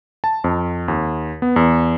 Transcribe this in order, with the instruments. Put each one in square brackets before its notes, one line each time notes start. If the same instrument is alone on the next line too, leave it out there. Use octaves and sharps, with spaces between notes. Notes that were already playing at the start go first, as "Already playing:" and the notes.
[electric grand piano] A5
F2
D#2
B3
E2